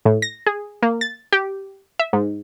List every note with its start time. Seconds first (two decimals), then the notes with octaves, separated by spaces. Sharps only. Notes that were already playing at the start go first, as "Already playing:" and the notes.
0.05 A2
0.22 A#6
0.47 G#4
0.83 A#3
1.01 A6
1.32 G4
1.99 E5
2.13 G#2